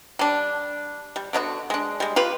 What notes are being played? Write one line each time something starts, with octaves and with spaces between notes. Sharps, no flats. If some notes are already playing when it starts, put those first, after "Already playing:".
G3 D4
G3
D3 B3 D#4 F#4
G#3 D4
G3 G#3
F4 G4 B4